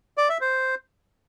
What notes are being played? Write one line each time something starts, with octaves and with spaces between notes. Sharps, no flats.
D5
E5
C5